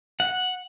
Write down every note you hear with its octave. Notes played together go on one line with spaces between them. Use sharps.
F#5